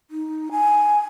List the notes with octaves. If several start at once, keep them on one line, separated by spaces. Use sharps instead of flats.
D#4
G#5